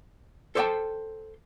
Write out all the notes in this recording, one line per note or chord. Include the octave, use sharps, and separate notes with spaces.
A4 C5 D5 F5 G5 A5